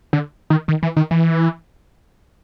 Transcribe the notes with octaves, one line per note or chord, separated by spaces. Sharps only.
D3
D#3
D#3
E3
D#3
E3